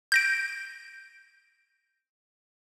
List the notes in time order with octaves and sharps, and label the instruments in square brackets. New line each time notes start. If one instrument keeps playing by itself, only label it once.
[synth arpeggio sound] G6 A#6 D7